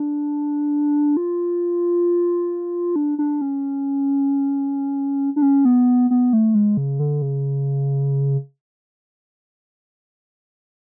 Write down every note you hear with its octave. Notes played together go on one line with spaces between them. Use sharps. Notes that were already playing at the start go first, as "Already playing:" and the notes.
Already playing: D4
F4
D4
D4
C#4
D4
C#4
B3
B3
A3
G#3
C#3
D3
C#3